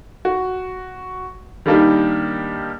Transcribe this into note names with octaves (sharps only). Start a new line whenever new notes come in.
F#4
D#3 G3 A#3 D4 D#4 G4